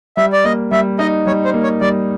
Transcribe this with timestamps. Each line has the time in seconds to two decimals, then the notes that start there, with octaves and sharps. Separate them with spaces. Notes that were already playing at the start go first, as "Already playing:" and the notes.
0.17 G3 E5
0.33 D5
0.44 A#3 D#5
0.71 G3 E5
0.99 D#4 D#5
1.27 G3 C#5
1.45 C5
1.54 A#3
1.63 C#5
1.81 G3 D5